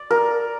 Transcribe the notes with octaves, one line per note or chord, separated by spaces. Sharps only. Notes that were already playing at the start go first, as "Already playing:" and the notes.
Already playing: D5
A#4